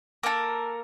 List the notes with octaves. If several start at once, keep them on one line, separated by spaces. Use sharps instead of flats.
A#3 E4 A4 A#4